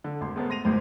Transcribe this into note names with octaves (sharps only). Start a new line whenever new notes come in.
D3
G#1 C6
G#3 A3 B3 A4 A#4 C5
C6 A#6 D#7 F7
G#1 C#2 G#2 C5